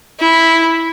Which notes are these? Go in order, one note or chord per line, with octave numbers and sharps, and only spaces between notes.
E4